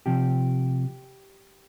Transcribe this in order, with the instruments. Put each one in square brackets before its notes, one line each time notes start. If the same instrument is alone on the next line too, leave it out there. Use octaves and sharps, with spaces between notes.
[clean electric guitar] C3 F3 G4